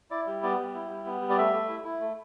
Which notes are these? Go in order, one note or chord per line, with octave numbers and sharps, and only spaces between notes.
E4 D5
G3
B3 D5
G3
E4
G3
B3
G3
D5
A3 E5
A3
E4
E4
A3